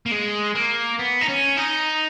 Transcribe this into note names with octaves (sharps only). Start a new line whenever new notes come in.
A#3
G#3
A#3
B3
D#4
C#4
D#4